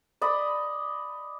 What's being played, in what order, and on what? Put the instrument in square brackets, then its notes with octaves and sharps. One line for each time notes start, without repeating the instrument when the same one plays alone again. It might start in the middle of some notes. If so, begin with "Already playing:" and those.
[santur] D5 D#5 B5